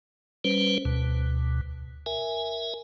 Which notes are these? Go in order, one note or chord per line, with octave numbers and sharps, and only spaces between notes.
G3 C#4 B4 C5
D2 B2
A#4 E5 G#5